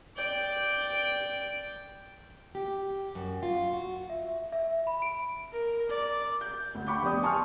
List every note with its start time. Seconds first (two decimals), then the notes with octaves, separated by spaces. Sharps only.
0.16 D5 G5
2.55 G4
3.15 F#2
3.43 F4
3.73 F#4
4.10 E5
4.52 E5
4.87 B5
5.02 D7
5.52 A#4
5.89 D5
6.41 G6
6.75 D2
6.87 G5 B5 C#6 D6 G6
7.02 F1 B3 D5 D#6
7.23 G#5 A5 C6 C#6 D#6 F6